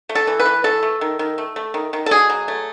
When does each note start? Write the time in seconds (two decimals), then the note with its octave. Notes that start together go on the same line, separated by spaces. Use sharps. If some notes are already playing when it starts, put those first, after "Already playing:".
0.09 A3
0.15 A4
0.27 E3
0.39 B4
0.45 E3
0.64 A3 A4
0.83 A3
1.01 D#3
1.19 D#3
1.38 A3
1.56 A3
1.74 D#3
1.93 D#3
2.06 A4
2.11 B2 G#4
2.29 F#3
2.48 A3